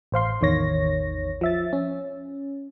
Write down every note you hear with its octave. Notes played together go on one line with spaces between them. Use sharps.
A1 C5 F5 C6
A1 E2 D#3 C#5 A#6
F3 E5 A6
C#4